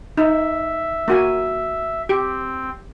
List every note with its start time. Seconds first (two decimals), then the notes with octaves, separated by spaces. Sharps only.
0.17 D#4 E5
1.08 A#3 F#4 G#5
2.09 C4 G4